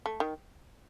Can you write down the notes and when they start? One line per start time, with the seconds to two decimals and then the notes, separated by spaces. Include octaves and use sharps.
0.06 A3
0.20 D#3